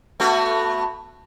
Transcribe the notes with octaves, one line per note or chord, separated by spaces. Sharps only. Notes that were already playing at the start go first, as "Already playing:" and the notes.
A3 B3 F#4